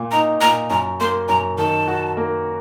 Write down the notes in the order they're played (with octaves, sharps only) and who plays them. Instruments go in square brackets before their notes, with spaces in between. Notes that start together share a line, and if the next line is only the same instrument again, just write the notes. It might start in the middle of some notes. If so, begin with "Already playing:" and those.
Already playing: [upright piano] A#2
[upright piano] D#4 [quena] A#5
[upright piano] A#2 [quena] A#5
[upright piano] F#2 [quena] A#5
[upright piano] A#3 [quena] C6
[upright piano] F#2 [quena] A#5
[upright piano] D#3 [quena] A5
[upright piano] F#4
A#3